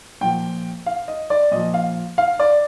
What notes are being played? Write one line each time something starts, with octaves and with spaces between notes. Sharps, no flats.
A#2 F3 G5
F5
D#5
D5
A#2 F3 D#5
F5
F5
D5